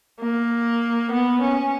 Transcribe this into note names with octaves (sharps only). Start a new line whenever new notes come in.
A#3
B3
C#4